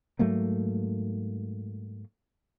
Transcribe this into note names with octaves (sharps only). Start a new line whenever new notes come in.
G#2 F#3 A3 A#3